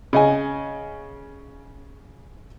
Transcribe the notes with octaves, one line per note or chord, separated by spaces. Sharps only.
C#3 D#5 G#5